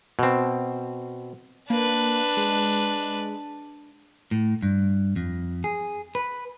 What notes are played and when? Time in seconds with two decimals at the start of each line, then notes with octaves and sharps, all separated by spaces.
0.19 B2 C4
1.70 A#3 D4 B4
2.37 G#3
4.31 A2
4.63 G2
5.16 F2
5.64 G#4
6.15 B4